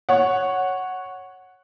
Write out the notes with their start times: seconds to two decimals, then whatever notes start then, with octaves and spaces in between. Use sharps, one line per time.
0.09 C#5 F#5